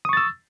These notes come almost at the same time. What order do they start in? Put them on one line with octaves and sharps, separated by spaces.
D#6 C#6 A6 E6